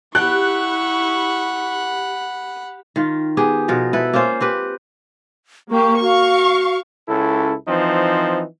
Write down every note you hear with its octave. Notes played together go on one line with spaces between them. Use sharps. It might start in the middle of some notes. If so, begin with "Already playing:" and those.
E4 G4 F#5 B5 C#6 F#6
D#3 F4
B3 G4 G#4
B2 F3 A#4
E4 A4 B4
A#3 C#4 F4 C5
C4 G4 B4
A#3 G4 C#6
F#4 F5 C#6
C#2 C#4 E4 A4
E3 F3 C4 D#4